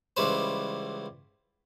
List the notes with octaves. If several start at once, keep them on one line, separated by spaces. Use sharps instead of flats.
C#2 E3 G3 C#4 B4 C5